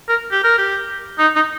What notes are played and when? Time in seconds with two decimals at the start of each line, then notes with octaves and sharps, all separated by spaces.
0.08 A#4
0.31 G4
0.44 A#4
0.58 G4
1.19 D#4
1.36 D#4